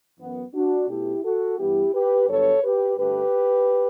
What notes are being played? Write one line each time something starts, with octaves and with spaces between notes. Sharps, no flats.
F#2 E3 B3
D4 F#4
B2 A3 E4 G4
F#4 A4
G2 E3 G3 B3 E4 G4
G4 B4
G2 D3 F#3 B3 A4 C#5
G4 B4
G2 D3 A3 G4 B4